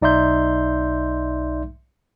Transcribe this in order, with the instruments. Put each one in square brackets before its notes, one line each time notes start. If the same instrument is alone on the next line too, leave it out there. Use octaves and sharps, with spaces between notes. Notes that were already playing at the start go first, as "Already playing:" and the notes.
[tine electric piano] B1 D#4 D5 E5 C6 G6